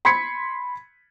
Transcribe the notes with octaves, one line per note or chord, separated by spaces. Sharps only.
B5 C6 G#6 B6 C#7